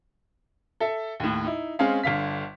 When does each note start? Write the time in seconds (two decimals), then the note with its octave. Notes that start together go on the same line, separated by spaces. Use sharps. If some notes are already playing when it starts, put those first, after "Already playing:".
0.80 A4 E5
1.20 D#2 A2
1.44 D#4 E4
1.79 G#3 C4 C#4 G#4 F5
2.03 G1 D3 F5 B6